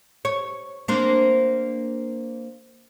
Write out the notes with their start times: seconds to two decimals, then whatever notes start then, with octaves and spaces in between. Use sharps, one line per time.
0.25 C#5
0.88 A#3 C4 D4